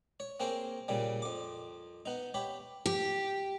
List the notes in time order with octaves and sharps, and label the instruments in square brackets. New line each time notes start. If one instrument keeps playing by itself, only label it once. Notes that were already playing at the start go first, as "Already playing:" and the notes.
[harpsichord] C#5
A#3 C4 G#4 C5 C#5
A#2 C#3 G3
F2 D6
B3 D#4
G4 C#5 B5
[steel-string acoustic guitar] G4